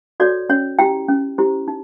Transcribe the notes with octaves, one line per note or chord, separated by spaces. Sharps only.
F#4 A4 C#5 D5
C#4 C#5
E4 G4 G5
C#4
E4 G4 C5
D#4